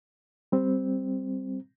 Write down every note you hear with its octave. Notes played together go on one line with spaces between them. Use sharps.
G3 C4